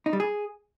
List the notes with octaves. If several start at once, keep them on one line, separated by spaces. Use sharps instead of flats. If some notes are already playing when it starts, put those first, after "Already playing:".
D#4
G3
G#4